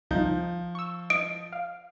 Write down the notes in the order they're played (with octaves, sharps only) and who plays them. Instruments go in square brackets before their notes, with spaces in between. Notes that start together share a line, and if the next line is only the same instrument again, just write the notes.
[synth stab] C#2 D#4 G6 [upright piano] F3
[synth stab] C#6 E6
[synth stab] D#5 [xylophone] D7
[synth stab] F5